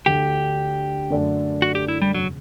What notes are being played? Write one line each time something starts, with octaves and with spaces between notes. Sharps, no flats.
D2 D3 A3 D4 G4
F#2 D3 A3 D4 A4
F#4
G4
E4
G3
E1 C#3 F#3